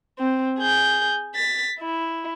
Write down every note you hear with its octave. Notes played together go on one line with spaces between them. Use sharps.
C4
G#4 G6
A6 B6
E4